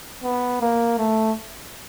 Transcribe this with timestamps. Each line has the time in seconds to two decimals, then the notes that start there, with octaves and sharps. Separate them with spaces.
0.24 B3
0.61 A#3
0.98 A3